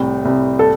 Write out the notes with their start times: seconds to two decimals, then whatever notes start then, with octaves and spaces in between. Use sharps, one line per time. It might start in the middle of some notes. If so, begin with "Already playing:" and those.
Already playing: C2 A2
0.25 C2
0.59 A4